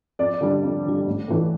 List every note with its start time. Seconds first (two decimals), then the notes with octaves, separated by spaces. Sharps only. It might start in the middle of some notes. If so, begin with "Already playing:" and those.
0.19 F2 D5
0.34 D5
0.41 D3 G3
0.48 D5
0.63 F2
0.86 D3 G3
1.07 A1
1.28 A2 E3 A3